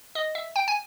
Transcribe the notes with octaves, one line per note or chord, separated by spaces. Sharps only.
D#5
E5
G5
G#5